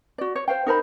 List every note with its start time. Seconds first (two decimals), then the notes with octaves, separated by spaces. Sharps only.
0.18 F#4 D5
0.36 C#5
0.48 C5 F5 G5
0.66 D#4 A#4 C5 B5